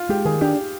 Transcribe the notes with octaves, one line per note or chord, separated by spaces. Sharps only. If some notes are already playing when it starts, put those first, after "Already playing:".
Already playing: F4
G#3 G4
D#3 G#4
D4 G4